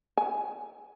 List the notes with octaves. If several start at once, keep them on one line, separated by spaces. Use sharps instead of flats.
G#5